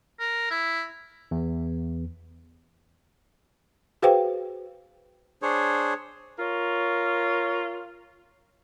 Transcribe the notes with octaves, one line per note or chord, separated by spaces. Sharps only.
A#4
E4
E2
F#4 G#4 B4 C5 F5 G5
D4 G#4 C5 C#5
F4 A#4 C#5